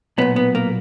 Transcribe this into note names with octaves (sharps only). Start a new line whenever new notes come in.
B1 A#2 B3
B3
A#3